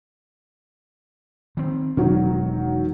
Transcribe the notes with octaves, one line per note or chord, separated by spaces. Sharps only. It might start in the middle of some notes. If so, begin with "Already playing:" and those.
D#3 C4
E1 D#3 F#3